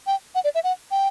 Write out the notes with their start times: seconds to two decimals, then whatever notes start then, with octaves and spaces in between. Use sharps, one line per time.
0.07 G5
0.35 F#5
0.44 D5
0.55 E5
0.64 F#5
0.91 G5